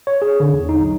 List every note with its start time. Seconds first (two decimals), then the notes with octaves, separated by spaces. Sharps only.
0.07 C#5
0.22 G#4
0.40 D3
0.53 E2
0.69 D#4
0.81 B1